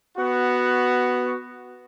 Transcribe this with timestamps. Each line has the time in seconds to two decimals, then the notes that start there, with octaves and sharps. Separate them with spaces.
0.17 B3 F#4